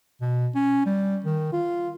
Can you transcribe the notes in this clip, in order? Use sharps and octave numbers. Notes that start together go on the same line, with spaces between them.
B2
C#4
G3
D#3
F4